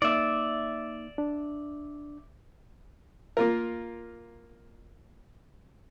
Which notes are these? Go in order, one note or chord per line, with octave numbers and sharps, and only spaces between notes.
A#3 D#4 D5 E5
D4
A#3 F4 A#4